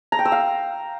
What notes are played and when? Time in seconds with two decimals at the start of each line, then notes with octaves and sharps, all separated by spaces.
0.12 A#5
0.19 G5
0.25 E6
0.32 F5